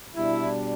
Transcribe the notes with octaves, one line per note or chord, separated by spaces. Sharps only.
B2 G3 D4 E4